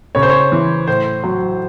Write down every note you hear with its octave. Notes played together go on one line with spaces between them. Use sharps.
C#3 C#5
C5
C#5
E3
A2 C5
F#3